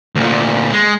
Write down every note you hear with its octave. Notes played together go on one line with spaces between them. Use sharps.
D2 A#2
G#3